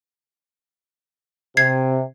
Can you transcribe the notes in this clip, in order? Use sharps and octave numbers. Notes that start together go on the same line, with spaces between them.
C3 G#6 C7